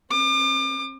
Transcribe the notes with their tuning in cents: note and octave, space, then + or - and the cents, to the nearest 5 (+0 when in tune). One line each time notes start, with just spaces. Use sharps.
C4 +45 D6 +35